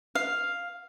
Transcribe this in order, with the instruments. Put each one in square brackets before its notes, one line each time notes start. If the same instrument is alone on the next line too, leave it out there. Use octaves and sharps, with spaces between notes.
[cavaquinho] F5